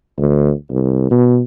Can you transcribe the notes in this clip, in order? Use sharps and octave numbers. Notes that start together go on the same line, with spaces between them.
D2
C2
B2